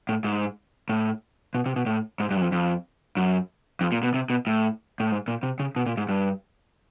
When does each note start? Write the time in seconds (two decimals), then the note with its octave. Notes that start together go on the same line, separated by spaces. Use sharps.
0.09 A2
0.24 G#2
0.89 A2
1.55 B2
1.66 C3
1.76 B2
1.86 A2
2.20 G#2
2.31 G2
2.36 F#2
2.41 F2
2.52 F2
3.17 F#2
3.81 F2
3.92 A#2
4.03 B2
4.14 C3
4.30 B2
4.47 A2
5.00 A2
5.11 G#2
5.28 A#2
5.43 C3
5.60 C#3
5.76 B2
5.86 A#2
5.98 G#2
6.09 G2